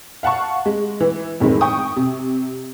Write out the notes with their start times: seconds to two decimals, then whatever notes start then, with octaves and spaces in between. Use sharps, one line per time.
0.23 F5 F#5 A5 C#6
0.66 G#3
1.00 E3
1.40 F2 A2 D#3 G#3 C4
1.61 G5 C#6 D#6
1.96 C3